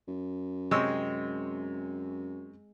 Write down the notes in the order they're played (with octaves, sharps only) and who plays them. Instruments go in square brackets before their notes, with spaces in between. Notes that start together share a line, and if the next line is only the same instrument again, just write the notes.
[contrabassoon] F#2
[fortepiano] C3 C#5 E6 [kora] G#3 C4